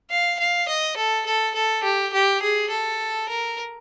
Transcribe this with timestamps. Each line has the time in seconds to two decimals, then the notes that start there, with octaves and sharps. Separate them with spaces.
0.10 F5
0.40 F5
0.69 D#5
0.97 A4
1.26 A4
1.55 A4
1.84 G4
2.13 G4
2.42 G#4
2.70 A4
3.29 A#4